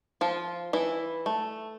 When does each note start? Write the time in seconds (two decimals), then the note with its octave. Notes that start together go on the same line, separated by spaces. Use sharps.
0.21 F3 F4
0.73 E3 E4
1.26 A3